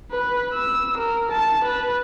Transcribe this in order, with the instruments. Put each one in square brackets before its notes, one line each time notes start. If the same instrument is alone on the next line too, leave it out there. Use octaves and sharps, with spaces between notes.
[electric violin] B4
E6
A#4
A5
B4